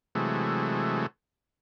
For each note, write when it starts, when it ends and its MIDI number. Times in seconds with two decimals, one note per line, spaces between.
0.15 1.06 48
0.15 1.06 52
0.15 1.06 54
0.15 1.06 56
0.15 1.06 57